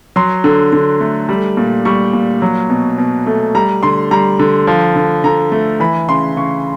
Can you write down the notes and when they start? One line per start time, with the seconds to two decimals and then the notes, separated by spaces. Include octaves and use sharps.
0.16 F#3 C6
0.44 D3
0.72 D3
1.01 A3
1.29 G3
1.57 A#2
1.85 G3 C#6
2.13 A#2
2.42 F#3
2.70 B2
2.98 B2
3.26 A3
3.55 G3 A#5
3.83 D3 C6
4.11 G3 A#5
4.39 D3
4.67 F3
4.95 D3
5.24 D3 A#5
5.52 A3
5.80 E3 B5
6.08 C#3 C6
6.37 C#3 C#6